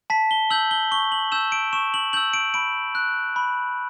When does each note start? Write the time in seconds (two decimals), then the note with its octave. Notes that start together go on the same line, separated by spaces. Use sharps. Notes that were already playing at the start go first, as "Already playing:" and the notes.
0.10 A5 B6
0.31 G7
0.50 E6 G6 F#7
0.71 G7
0.91 C#6 G7
1.12 F#7
1.32 E6 G6 E7
1.52 D7
1.73 C#6 E7
1.94 F#7
2.13 E6 G6 F#7
2.34 D7
2.54 B5 D7
2.95 F#6
3.36 B5